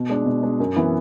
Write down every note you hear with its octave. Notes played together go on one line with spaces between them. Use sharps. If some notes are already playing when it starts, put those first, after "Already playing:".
Already playing: B2
G#3 D4
B2
G#3 D4
F#2
E3 B3 E4